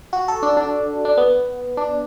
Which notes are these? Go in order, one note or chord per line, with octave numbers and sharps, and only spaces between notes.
F#4
A4
D4
D4
D4
B3
D4